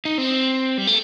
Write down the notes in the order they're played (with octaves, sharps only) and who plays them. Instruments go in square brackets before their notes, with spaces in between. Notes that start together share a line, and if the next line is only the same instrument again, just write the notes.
[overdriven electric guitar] D#4
C4
G3
A3